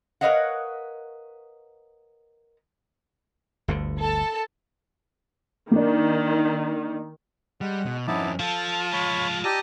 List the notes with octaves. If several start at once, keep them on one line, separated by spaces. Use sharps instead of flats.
A#4 B4 C#5 D#5 F5 F#5
G1 D2 D3
A4 A5
D#3 A#3 D4
G3 G#3 F#5
B2
F2 B3 C#4 D#4 E4 A5 D6
F3 F4 A4 A5
F3 G#3 C#5 B5
G4 D5 D#5 A5 A#5 E6